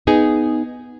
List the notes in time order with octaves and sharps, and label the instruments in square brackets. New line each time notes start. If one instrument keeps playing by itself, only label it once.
[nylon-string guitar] B3 D#4 G#4